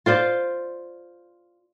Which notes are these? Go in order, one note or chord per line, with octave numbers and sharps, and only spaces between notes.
F4 C5 D5